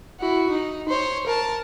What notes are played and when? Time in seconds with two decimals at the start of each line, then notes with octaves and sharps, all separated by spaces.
0.20 E4 F#4
0.50 D#4
0.88 C5 C#5
1.26 A#4 A5